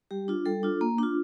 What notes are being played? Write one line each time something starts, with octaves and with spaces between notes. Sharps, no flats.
G3 G4
D4 F4
G3 A4
D4 F4
A#3
D4 F4